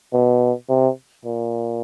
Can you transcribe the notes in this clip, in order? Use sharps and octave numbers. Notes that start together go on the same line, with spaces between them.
B2
C3
A#2